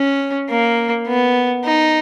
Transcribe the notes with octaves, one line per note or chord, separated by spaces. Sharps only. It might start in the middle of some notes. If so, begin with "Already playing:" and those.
Already playing: C#4
A#3
B3
D#4